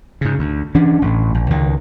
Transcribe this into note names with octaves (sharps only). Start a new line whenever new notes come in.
G#2 C#3
D2
E3 C#4 D4
A1 A2
A#1
C#2 D#3